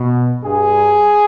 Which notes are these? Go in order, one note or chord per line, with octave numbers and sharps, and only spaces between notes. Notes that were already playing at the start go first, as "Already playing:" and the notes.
Already playing: B2
G2 G#4